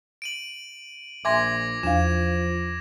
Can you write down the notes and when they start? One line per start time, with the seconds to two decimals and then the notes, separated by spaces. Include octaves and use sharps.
0.22 D7 D#7 F#7
1.25 A#1 E5 G#5 C6 D6 G#6 A#6
1.83 E2 F3 D4 F5 E7